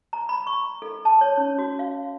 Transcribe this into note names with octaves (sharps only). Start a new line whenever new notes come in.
A#5
B5
C#6
A4
A5
C#5
C#4
F#4
F5